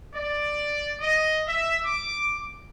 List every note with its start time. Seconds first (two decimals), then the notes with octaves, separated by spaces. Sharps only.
0.15 D5
1.01 D#5
1.48 E5
1.85 D6